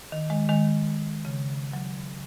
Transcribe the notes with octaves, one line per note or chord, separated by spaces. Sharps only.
D#3
D#3 G#3
D#3 G#3
C#3
F#3